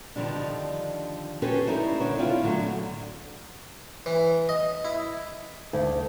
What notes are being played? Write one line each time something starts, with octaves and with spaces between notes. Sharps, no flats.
D3 D#3 F3 G3 D4
C#4 F#4 G4 A4 B4 C5
G3 D#4 E4 C5
D3 C5 C#5
C4 D4 E4 F4
A2 D3 F#3 A3
E3
D#5
E4
D2